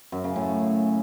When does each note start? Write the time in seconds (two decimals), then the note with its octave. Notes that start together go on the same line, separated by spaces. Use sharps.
0.12 F#2
0.24 C#3
0.36 A2